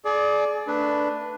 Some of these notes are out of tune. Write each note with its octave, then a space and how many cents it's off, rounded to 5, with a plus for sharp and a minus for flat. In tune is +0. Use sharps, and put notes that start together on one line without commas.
G#4 +35 D5 +0
A3 +15 D4 +0 B4 +0